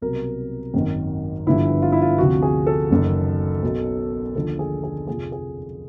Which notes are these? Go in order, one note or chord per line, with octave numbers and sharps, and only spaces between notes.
C2 B2 F#3 A#4
G#1 F#2 D#3
G1 G2 D3 F3 E4
F4
E4
F4
D2 C3 F3 F#4
G#4
A4
F#1 F#2 D#3
B1 B2 F#3
D#2 D3 F3 A4
G#4
G#4
F2 C3 F3 G#4
G#4